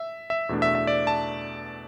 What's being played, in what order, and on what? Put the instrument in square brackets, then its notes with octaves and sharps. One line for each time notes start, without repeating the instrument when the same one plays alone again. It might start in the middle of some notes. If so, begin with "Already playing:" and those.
Already playing: [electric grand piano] E5
E5
E2 B2 A3 D4
E5
E5
D5
A5